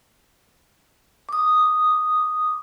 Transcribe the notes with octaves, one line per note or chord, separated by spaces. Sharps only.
D6 D#6